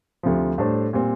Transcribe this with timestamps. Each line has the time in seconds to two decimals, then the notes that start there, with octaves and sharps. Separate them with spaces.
0.23 D2 C3 F3
0.58 A2 G3 D4 A4 C5
0.93 A#2 G3 C4